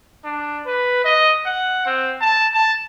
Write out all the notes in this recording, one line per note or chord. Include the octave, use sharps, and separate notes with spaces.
D4
B4
D#5
F#5
C4
A5
A5